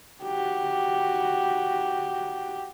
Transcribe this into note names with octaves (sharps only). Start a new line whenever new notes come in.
F#4 G4